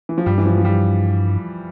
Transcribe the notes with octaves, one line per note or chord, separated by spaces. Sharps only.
E3
F3
G2 G3
E3
F3
F3
G3